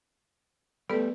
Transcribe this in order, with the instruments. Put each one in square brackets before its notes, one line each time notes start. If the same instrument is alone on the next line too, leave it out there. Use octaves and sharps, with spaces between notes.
[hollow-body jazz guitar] G3 A3 [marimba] B3 B4 [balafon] A4